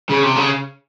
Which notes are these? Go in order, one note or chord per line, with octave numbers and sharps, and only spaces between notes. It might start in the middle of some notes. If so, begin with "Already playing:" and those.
C#3
C3
C#3